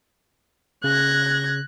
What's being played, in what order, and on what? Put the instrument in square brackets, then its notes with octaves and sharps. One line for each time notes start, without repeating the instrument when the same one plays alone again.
[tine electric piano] C#3 [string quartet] F#6 G#6 A#6